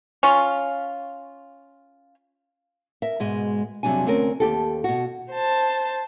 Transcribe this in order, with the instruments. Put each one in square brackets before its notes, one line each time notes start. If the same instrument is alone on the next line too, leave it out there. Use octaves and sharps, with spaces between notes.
[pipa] C#4 F4
[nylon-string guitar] A#4 E5
G#2 B2 G#3
F2 C3 F#3 G3 D4 G#5
D2 C4 C#4 A#4
D#2 G4 A4
B2 F#4
[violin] C5 A5